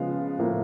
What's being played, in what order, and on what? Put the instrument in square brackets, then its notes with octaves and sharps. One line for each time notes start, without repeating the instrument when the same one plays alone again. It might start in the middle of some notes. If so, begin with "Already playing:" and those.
Already playing: [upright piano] C#3 F3 G#3 B3 F5
A2 F3 A#3